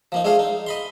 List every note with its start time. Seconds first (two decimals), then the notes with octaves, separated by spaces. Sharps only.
0.12 F3 A#3 D#4
0.24 G#3 A3 D4 G#4 C5 F5
0.39 D#4
0.66 D#5 B5 C6